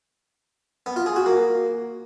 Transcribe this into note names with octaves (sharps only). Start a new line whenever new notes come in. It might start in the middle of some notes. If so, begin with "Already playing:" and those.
B3
F4
G#4
F#4
A#3